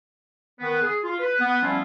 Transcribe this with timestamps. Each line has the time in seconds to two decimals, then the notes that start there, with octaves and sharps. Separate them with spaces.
0.60 D#3 B3
0.82 G#4
1.04 F4
1.19 B4
1.40 B3
1.61 F3 G3 B3 C#4 E4 F4